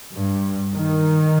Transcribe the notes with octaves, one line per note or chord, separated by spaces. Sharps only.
G2
D#3